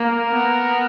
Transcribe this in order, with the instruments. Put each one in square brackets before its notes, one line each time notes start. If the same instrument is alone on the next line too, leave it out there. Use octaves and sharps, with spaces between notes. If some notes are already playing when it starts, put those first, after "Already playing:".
Already playing: [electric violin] A#3 [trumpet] A#4
[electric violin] B3